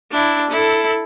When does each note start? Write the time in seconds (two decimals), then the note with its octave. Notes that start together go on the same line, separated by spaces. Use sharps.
0.12 D4 E4
0.50 E4 A4